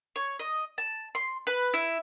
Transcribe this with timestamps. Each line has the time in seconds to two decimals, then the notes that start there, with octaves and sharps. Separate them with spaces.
0.16 C#5
0.40 D#5
0.78 A5
1.15 C6
1.47 B4
1.74 E4